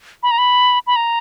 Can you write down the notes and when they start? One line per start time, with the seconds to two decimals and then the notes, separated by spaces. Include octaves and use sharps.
0.23 B5
0.31 A#5
0.38 B5
0.87 B5
0.96 A#5